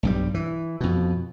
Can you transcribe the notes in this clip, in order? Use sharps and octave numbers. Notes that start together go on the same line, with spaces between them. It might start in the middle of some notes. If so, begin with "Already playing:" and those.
B1 G2 G3
E3
F2 B2